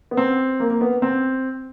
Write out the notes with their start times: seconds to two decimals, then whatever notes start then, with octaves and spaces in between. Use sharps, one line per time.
0.11 B3
0.17 C4
0.60 A#3
0.70 A#3
0.81 B3
1.02 C4